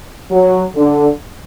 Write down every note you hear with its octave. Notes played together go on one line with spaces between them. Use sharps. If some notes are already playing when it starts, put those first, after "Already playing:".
F#3
D3